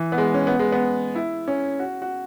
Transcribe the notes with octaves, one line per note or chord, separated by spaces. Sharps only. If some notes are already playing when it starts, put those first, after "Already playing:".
Already playing: E3
B3
G#3
C#4
B3
G#3
B3
E4
C#4
F#4
F#4